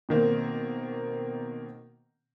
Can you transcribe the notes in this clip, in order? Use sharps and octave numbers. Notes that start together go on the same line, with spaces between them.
B2 D#3 A#3 C4